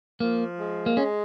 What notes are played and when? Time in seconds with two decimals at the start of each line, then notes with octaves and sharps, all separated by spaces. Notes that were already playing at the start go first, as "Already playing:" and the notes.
0.20 F3 A#3
0.59 G#3
0.86 A#3
0.97 G#3 C#4